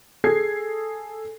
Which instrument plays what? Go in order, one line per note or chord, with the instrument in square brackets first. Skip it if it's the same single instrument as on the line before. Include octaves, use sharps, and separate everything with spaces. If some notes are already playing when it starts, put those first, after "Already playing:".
[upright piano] G#4 A4 G#6 C7